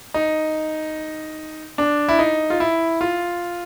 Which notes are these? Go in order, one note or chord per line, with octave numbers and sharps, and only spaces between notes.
D#4
D4
E4
D#4
F4
E4
F4